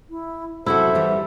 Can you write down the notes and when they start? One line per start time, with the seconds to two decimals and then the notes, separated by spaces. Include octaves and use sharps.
0.10 E4
0.66 F#2 C3 E4 F#4 A4 C5 E5
0.95 E3 G3